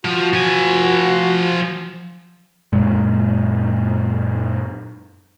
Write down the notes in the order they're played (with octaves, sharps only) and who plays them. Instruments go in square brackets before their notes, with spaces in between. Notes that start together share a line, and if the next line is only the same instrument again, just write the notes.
[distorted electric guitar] F3 [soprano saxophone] F#4
[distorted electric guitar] F3 G#5
[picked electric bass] F#2 A#2 G#3